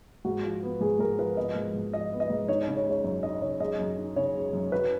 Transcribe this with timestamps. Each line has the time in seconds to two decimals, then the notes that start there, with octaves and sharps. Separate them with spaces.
0.25 G#2 F#4
0.44 F3
0.63 B3
0.81 G#2 G#4
0.99 G#2 A#4
1.18 F3 B4
1.37 B3 D#5
1.55 G#2
1.74 G#2
1.93 F3 D#5
2.12 B3
2.20 D#5
2.30 G#2
2.48 D#4 C#5
2.63 C#5
2.68 C#3
2.77 C#5
2.85 G#3
2.91 C#5
3.04 F#2 C#5
3.23 D#4 D#5
3.41 C#3 C#5
3.60 G#3 D#5
3.79 F#2
3.98 D#4
4.16 C#3 C#5
4.35 G#3
4.53 F#2
4.72 F#4 B4